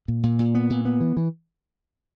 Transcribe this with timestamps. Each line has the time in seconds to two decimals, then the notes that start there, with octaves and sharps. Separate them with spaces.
0.08 A#2
0.23 A#2
0.39 A#2
0.55 B3
0.70 A#2
0.85 B3
1.00 E3
1.17 E3